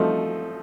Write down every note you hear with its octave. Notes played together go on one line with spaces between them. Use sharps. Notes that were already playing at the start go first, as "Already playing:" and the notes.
Already playing: F3 A3 C4 D#4